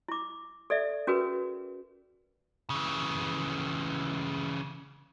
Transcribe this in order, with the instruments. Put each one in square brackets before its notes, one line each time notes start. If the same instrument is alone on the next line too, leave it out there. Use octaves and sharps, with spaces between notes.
[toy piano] E4 D6
A4 D5 E5
C#4 F#4 G#4 A#4 B4
[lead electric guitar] C#3 E3